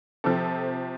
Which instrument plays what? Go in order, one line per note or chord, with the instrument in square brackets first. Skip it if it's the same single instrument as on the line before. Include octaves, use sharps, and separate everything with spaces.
[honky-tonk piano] C3 F3 C4 A4